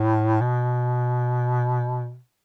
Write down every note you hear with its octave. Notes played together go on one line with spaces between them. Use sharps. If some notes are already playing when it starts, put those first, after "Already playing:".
Already playing: A2
B2